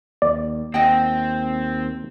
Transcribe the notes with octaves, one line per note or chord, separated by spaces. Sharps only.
D#2 D5
D#2 C4 D#5 F#5 G5